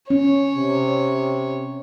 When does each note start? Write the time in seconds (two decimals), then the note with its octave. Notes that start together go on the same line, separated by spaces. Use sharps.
0.10 C#4 C#5
0.55 C3